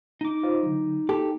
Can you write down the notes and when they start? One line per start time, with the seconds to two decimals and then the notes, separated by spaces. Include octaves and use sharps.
0.21 D#4 D6
0.43 F4 C5 D#5
0.63 D3 F#3
1.09 A#3 G4 A4